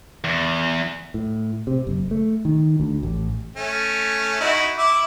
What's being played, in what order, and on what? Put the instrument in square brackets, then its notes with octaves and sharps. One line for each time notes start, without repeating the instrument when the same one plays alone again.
[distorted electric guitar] E2
[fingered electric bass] A2
C3
F#1
A3
D#3
D2
A1
[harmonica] A3 C#4
D#4 E4 F#4
E4 E5 D6